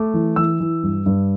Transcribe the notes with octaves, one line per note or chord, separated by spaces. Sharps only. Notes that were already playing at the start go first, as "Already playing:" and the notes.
Already playing: A3 D6
E3
E3 E6
E3
G2
G2